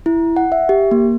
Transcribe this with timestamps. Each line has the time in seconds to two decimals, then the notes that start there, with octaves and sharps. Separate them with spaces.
0.06 E4
0.36 F#5
0.52 E5
0.69 G4
0.91 A#3